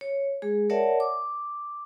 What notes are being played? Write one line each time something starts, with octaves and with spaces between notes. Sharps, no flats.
C#5
G#3 G#4
A#4 C#5 D5 E5 F#5 A5
D6